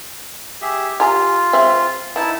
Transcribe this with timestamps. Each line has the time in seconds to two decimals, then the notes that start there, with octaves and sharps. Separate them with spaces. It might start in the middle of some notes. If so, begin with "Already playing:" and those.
0.62 G4 G#4 E5
1.00 F4 G4 G#5 A#5
1.53 G#3 C4 E5
2.16 E3 D#4 E4 A5